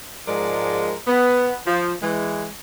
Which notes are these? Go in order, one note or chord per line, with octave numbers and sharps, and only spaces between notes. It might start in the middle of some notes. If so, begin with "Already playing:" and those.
G#2 F3 G#3 A#4 D5
B3
F3
E3 G#3